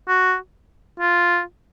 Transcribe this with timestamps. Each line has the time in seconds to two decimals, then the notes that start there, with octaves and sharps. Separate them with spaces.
0.08 F#4
1.00 F4